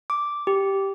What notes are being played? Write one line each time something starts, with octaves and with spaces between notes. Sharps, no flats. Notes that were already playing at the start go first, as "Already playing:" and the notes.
D6
G4